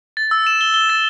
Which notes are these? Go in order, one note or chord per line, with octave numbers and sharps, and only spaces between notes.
A6
E6
E7
G7
G7
A6